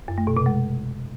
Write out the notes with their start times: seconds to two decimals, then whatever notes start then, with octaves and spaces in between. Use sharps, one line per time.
0.08 F#2
0.18 A3
0.27 B2
0.37 C3
0.46 G#3